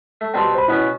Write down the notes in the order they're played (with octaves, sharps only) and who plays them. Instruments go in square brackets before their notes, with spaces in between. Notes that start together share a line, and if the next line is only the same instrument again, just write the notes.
[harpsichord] A3
[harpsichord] B2 G3 C4 [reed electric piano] G5 A5 C6
[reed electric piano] C5 B5
[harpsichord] B2 B3 C#4 [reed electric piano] E4